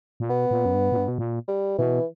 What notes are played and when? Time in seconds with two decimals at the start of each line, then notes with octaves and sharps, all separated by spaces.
0.20 A#2
0.30 B2 B3
0.51 A#2
0.65 F#2
0.74 G2
0.92 A#2
0.97 G2
1.08 B2
1.18 A#2
1.48 G3
1.78 B2 E3